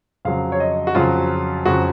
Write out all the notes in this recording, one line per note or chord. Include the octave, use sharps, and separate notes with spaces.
F2 C#3 F#3 F5
C#5
D#5
F#4
F2 C#3 F#3 F4
F2 C#3 F#3 F#4